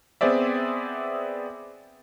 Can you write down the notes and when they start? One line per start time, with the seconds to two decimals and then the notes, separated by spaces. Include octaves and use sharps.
0.21 B3 C4 G#4 C5 D5 E5